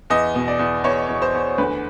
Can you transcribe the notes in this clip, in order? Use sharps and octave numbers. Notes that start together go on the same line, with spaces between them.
E2 D#5
B2
D5
E2
E2 C#5
E2
C5
E2
D2 B4